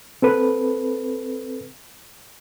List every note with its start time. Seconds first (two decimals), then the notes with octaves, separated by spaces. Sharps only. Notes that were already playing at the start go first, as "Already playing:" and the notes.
0.22 C4 A4 B4